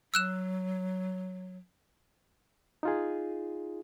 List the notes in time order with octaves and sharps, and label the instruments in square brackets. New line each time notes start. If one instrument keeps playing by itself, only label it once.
[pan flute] F#3 [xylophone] E6 F#6 E7
[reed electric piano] D#4 F4 G#4